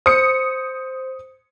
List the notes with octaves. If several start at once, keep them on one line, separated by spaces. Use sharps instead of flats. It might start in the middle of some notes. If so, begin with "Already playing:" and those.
C5 D#6 C#7